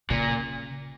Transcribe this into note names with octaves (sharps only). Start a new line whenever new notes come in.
A#2 C#3